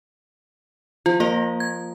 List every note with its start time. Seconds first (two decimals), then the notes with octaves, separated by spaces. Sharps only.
1.06 F3 F4
1.20 A#3 A#4 D#5
1.60 G#6